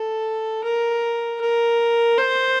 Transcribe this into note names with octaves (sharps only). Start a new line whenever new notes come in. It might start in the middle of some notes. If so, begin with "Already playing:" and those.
Already playing: A4
A#4
A#4
C5